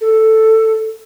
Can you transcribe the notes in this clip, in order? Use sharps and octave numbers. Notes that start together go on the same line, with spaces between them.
A4